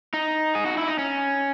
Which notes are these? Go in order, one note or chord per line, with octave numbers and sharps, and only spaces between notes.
D#4
G#4
F#4
E4
D#4
C#4